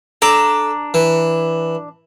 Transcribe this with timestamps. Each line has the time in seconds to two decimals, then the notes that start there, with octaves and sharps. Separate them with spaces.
0.22 D4 A4 A#5
0.94 E3